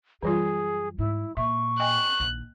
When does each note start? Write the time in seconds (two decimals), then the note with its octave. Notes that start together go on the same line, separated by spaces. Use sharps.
0.23 F#2 E3 G3 F4 G#4
0.98 G#2 E4
1.37 A#2 E5 C#6
1.80 D#5 G5 G#5 F#6
2.20 A#1 D#3